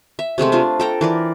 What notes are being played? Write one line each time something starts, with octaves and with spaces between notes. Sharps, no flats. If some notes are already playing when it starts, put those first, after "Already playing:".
E5
C3 G#3 A3 C4
C4 D4 F4
A4 G5 A#5
E3 A#4 D5